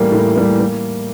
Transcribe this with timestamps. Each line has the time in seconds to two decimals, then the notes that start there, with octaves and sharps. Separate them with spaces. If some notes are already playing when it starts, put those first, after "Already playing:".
Already playing: A2 E3 G3 A#3
0.12 A2
0.36 E3 G3 A#3
0.60 A#3